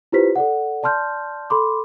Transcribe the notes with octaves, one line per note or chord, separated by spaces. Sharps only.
E4 F4 G4 B4 C5 B6
A4 D5 F#5
D5 A5 C6 F6 G6
A4 B5 C6 D6